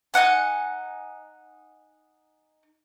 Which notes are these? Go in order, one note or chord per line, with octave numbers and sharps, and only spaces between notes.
D#4 D#5 F#5 G#5